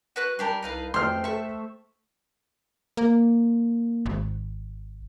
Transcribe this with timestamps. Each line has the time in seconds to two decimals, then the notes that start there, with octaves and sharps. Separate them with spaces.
0.16 F#4 B4 F#6
0.39 G3 D4 G4 A#4 G#5 A5
0.63 C2 D#4 B4 F5
0.94 F2 A3 C5 G5 C6 F6
1.24 A4 C5 E5 C#6
2.97 A#3
4.06 G#1